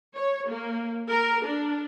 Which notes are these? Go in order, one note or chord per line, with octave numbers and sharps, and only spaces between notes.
C#5
A#3
A#4
D4